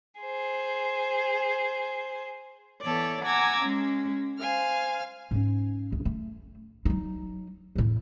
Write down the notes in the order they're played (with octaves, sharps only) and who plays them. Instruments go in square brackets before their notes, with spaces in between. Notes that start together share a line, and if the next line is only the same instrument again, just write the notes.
[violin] G#4 C5
[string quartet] E3 B3 A4 C#5 D5
F#5 G#5 A#5 D6 E6 G#6
G#3 C#4
C5 F5 G#5 F6
[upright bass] G#2 C#4
D2
A3
F#3 D#4
E2 A2